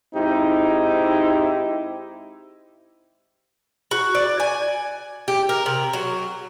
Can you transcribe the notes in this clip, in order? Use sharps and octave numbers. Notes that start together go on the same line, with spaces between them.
G#2 C4 D#4 E4 G4
F#4
D5
G#5
G4
A#4
C3
F#3